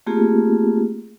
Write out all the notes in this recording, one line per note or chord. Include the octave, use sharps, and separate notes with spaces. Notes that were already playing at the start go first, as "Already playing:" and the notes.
A3 A#3 C4 F4 G4 G#4